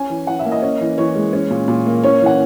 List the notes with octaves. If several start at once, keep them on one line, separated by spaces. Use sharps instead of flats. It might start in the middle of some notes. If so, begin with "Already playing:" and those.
Already playing: C#4 G#5
E3
E3 F#5
E5
A#3
D#5
C#4
E3
E3 C#5
G#3
C#4
A#2
A#2
A#3
C#4 C#5
E3 F#5